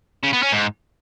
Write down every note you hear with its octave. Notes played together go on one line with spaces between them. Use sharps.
C#3
B3
C#4
G#2